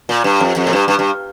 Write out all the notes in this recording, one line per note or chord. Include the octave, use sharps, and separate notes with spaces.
A#2
G2
F2
F2
A#2
G2
G2
G2